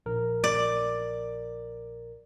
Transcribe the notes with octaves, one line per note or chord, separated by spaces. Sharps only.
A#1 A#4
D5